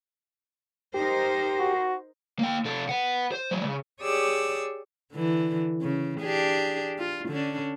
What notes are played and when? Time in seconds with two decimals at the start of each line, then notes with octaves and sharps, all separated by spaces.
0.94 D#4 G4 A#4 C5
1.59 F#4
2.39 A#3 G5
2.65 C3 A4
2.89 B4 F#5
3.32 C5
3.51 F#3 G#3
3.64 C#3
4.02 G4 G#4 C#5 D5 D#6 E6
5.13 D3 E3
5.82 C#3
6.20 D4 G4 G#4
6.99 F4
7.29 D3 C#4 D4